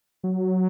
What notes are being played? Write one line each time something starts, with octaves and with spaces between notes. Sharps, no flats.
F#3